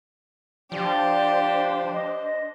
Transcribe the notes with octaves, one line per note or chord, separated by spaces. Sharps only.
F3 D4 G4 C5 D5
D#5